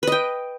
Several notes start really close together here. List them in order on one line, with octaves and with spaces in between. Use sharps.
B4 D#5 G5